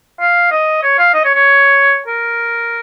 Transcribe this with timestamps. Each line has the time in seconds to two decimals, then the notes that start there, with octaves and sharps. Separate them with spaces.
0.21 F5
0.51 D#5
0.83 C#5
0.99 F5
1.14 D#5
1.25 C#5
1.35 C#5
2.08 A#4